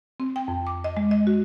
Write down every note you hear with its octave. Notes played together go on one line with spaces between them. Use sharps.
C4
G5
F2
D6
D#5
G#3
D#5
F#4